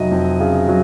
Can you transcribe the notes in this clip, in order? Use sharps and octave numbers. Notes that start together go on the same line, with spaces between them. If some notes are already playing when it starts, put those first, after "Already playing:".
Already playing: F1 F#3 D#5
F2
C#3
F#3